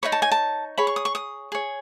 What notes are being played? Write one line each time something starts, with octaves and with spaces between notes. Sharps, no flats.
D#4 F#4 C#5 B5
A5
G#5
A5
G#4 C#5 B5
C#6
D#6
C#6
D#6
G#4 C#5